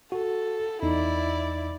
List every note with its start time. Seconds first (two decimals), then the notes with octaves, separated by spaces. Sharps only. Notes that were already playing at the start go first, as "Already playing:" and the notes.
0.12 F#4 A4
0.83 E2 D#4 E4 D5